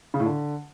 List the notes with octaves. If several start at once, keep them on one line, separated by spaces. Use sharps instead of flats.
C#3
A2
D3